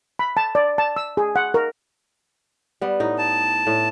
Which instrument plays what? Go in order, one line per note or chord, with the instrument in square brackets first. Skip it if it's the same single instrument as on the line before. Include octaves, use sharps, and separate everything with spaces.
[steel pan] B5
A5
D5
A5
E6
G#4
F#5
A#4
[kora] G3 B3
A2 D#4
[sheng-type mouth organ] A5
[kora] A2